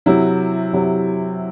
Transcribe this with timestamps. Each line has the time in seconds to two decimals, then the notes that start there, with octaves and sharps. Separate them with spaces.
0.06 C3 F#3 E4
0.73 C3 F#3